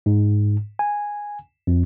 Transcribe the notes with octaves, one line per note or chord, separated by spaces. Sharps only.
G#2
G#5
F2